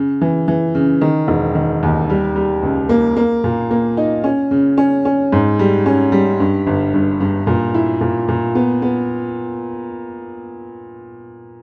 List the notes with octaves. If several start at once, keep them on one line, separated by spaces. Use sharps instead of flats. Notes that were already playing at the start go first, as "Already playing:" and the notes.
Already playing: C#3
E3
E3
C#3
D#3
E1
D#3
D#2
G3
G3
C#2
A#3
A#3
A#2
A#3
D#4
C#4
C#3
C#4
C#4
G#2
G3
C#4
G3
G2
G1
G2
G2
A#2
E4
A#2
A#2
B3
B3